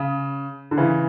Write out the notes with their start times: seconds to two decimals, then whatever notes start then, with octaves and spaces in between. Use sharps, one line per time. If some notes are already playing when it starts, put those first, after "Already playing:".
Already playing: C#3
0.71 D3
0.77 C#3 E3